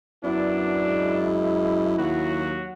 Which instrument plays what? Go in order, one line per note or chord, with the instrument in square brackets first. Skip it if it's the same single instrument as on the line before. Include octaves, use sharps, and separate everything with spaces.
[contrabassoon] F#2 [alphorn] B3 [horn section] D4 [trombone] E4
[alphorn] G#3
[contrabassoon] D#2 [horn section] F#3 F#4